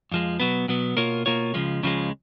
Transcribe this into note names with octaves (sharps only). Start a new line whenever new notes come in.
F2 F3 G#3
B2 F#3 B3
B2 F#3 B3
B2 A#3 F4 A#4 C#5
B2 A#3 F4 A#4 C#5
C#2 C#3 F3 G#3
C#2 C#3 F3 G#3